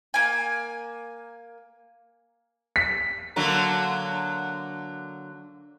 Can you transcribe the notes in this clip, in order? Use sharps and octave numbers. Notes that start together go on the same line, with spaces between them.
A#3 G#5
B6
D3 F#3 A#3